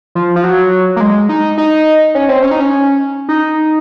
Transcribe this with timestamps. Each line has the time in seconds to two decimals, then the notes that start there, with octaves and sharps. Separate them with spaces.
0.15 F3
0.36 F3
0.44 F#3
0.96 A#3
1.00 G#3
1.29 D#4
1.58 D#4
2.15 C#4
2.29 C4
2.42 C#4
2.51 D#4
2.60 C#4
3.29 D#4